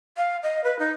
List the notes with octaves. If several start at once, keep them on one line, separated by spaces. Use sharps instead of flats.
F5
D#5
B4
D#4